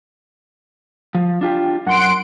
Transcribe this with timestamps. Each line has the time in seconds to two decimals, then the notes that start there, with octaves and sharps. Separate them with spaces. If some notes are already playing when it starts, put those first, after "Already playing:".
1.15 F3
1.41 D4 F4 G4
1.87 F#2 F#5 C6 D7